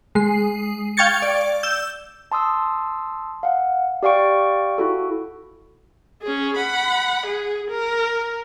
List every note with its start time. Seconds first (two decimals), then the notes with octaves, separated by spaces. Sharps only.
0.15 G#3 C7
0.97 F5 G5 C#6 G#6 A6 C#7
1.22 D5
1.63 E6 G6
2.32 A5 C6 D#6 E6
3.43 F5 F#5
4.03 G4 D5 F5 G5 C#6 D7
4.78 E4 F#4 A4
6.22 C#4 G#4
6.56 F#5 B5
7.26 G#4
7.71 A#4